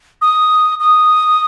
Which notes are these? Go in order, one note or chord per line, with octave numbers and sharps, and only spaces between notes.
D#6
D#6